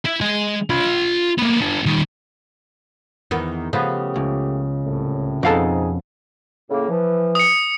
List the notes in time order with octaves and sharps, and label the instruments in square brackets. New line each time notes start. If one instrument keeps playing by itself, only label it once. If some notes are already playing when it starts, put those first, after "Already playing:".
[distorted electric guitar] E4
G#3 G#5
F4 B5
A#3 B3
B3 D4
D#3 G3
[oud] E2 D#3 B3
[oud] C#3 [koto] F3 B3 [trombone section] A3 G4
[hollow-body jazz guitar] C#2
[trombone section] C2 A2
[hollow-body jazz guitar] F2 F5 A5 [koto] B2 A4 [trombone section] C4 D#4 G#4
[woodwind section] A2 C#3 A#3
E3 F3
[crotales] D#6 C#7